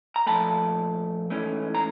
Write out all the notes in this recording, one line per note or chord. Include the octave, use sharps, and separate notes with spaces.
A#5
A#2 F3 A3 A5 B5
G#2 E3 A3 C#4
A#5